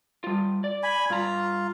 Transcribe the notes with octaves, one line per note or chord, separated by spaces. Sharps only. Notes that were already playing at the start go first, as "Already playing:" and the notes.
G3 F4
D5
G#5 B5
G2 F4 A#5